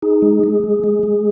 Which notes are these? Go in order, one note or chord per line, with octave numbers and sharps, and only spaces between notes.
D#4 G#4
G#3
G#3
G#3
G#3
G#3